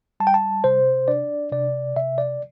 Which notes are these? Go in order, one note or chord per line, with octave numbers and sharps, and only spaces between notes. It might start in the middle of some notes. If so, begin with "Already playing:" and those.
G3 A5
G5
A5
C3 C5
D4 D5
C3 D5
C3 E5
D5